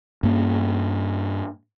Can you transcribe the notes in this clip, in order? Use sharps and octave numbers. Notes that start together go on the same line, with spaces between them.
G2 A#3 C#4